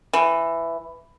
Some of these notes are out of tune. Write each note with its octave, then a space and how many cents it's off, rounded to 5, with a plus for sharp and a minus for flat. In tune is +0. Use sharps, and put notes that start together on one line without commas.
E3 +10